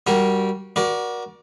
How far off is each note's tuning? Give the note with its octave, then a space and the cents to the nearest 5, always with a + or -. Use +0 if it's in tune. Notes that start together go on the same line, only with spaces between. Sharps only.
G3 -15 F#4 +0 A#4 +0
F#4 +0 A#4 +35 D5 +0